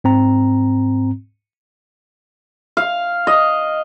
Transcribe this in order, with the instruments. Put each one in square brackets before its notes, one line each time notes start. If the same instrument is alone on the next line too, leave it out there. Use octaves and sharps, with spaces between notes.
[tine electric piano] G#2 C4 A#5
[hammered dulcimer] F5
D#5